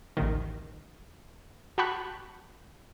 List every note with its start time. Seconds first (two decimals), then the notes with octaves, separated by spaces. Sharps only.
0.17 A1 D#2 D#3
1.78 F#4 G5 A5 B5 C#6 F#6